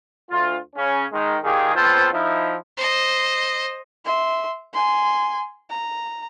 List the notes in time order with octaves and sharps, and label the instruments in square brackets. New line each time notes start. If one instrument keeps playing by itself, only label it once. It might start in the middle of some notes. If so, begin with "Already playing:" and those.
[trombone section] D2 F4
C#3 C#4
D#3 G#3
A#2 D#3 F4 G4 G#4
C#2 B3 C4 F4 A4 C5
F3 D#4 E4
[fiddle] C5 D#5
[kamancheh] E5 C6
G#5 C6
A#5